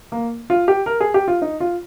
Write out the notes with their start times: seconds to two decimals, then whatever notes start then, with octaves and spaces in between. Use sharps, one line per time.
0.12 A#3
0.50 F4
0.68 G4
0.86 A#4
1.00 G#4
1.14 G4
1.28 F4
1.42 D#4
1.60 F4